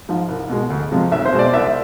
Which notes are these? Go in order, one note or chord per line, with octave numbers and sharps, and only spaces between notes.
G#2 F3
C2
B2 G#3
D2
C3 F3 G#3
B1 E5
C5
B2 G#3
D5
C2 E5